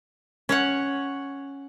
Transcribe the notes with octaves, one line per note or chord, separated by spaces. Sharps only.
C#4 C#5 F#5